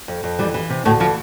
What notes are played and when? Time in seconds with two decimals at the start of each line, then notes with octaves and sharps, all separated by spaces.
0.08 F2
0.24 F2
0.39 E3 G3
0.54 E3
0.70 C3
0.85 D2 A2 A3
1.00 E3 F3